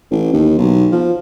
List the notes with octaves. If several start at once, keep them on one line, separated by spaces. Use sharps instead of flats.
A1
D#2
B1
F3